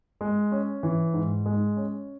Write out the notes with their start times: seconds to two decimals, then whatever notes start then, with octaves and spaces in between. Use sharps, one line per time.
0.21 G#3
0.52 C#4
0.83 E3
1.14 G#2
1.46 G#3
1.77 C#4